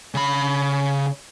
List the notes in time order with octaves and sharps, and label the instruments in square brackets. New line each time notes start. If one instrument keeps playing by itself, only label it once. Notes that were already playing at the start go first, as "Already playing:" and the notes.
[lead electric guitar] C#3 B5